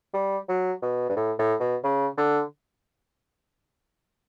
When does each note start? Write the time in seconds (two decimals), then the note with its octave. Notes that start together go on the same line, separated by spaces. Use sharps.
0.14 G3
0.49 F#3
0.82 B2
1.09 G2
1.16 A2
1.39 A2
1.60 B2
1.84 C#3
2.17 D3